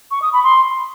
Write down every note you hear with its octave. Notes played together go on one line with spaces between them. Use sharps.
C#6
D#6
B5
C6